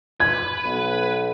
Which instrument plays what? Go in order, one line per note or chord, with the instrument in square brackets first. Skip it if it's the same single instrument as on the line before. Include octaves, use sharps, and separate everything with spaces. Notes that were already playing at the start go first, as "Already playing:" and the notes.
[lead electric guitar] B4 [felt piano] G#6
[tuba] B1